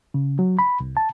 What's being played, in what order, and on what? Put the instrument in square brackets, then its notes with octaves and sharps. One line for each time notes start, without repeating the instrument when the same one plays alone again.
[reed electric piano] C#3
F#3
B5
C2
A5